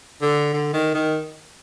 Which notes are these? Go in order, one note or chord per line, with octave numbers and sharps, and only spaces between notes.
D3
D3
D#3
D#3